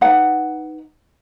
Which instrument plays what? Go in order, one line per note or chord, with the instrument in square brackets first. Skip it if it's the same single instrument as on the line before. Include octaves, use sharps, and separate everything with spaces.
[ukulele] D#4 B4 F#5